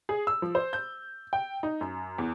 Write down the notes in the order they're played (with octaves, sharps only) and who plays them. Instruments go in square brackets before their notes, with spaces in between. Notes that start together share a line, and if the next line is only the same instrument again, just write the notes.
[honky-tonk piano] G#4
E6
F3
C5
G6
G5
D#4
F#2
E2